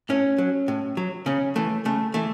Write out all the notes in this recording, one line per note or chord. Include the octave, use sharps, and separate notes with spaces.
A2 C#4
F#3
A2
F#3
C#3 C#4
E3 A3
C#3 A3
E3 A3